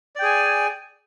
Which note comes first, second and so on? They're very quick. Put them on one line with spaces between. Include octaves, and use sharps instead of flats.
D5 G5 G#4 G#5